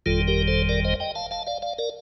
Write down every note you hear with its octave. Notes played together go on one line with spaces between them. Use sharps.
G1 F2 D#3 G3 F4 A4
G4 A#4
A4 C5
A#4 D5
C5 D#5
D#5 G5
F5 A5
F5 A5
D5 F5
D5 F5
A#4 D5